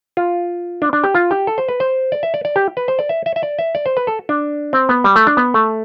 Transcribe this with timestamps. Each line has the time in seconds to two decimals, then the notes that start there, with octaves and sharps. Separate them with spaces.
0.17 F4
0.82 D4
0.93 D4
1.04 G4
1.15 F4
1.31 G4
1.47 A4
1.58 C5
1.69 B4
1.80 C5
2.12 D5
2.23 E5
2.34 D5
2.45 D5
2.56 G4
2.77 B4
2.88 C5
2.99 D5
3.09 E5
3.26 E5
3.36 E5
3.43 D5
3.59 E5
3.75 D5
3.86 C5
3.97 B4
4.07 A4
4.29 D4
4.73 C4
4.89 B3
5.04 G3
5.16 A3
5.27 D4
5.37 B3
5.54 A3